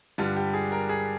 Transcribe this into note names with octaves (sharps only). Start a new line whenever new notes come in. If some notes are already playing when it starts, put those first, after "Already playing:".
G2 D3 G3 F4
G4
G#4
A#4
G#4